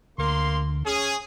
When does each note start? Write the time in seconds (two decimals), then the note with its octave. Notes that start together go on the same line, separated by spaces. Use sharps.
0.18 D2 A#3 C6
0.85 C#4 G#4